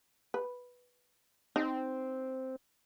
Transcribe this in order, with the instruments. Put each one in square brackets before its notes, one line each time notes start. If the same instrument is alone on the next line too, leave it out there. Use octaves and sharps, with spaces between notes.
[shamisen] B4
[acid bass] C4 [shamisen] D#4